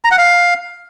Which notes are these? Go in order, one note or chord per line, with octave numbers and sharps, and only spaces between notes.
A#5
F#5
F5